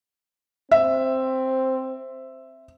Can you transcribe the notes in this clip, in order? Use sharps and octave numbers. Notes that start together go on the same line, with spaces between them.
C4 E5